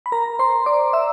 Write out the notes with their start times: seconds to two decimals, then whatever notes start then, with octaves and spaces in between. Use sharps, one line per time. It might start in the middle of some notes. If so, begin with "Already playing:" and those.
0.06 B5
0.12 A#4 A#5
0.39 C5 C6
0.66 D5 D6
0.93 E5 E6